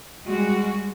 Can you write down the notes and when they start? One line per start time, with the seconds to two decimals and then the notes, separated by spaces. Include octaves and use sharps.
0.24 G3 G#3 F#4